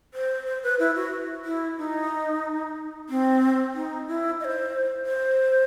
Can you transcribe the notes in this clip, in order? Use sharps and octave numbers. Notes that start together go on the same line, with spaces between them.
C5
C5
B4
E4
F#4
E4
D#4
C4
D#4
E4
D#5
C5
C5